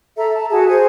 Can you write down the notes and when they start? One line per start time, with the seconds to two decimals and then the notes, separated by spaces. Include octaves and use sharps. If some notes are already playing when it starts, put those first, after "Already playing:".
0.17 A4 E5 A#5
0.36 A5
0.51 F#4 G#4 F#5 A5
0.68 G#4 C5 G#5